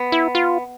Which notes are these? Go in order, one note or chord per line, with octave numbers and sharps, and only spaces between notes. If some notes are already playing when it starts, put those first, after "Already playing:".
Already playing: B3
E4
F4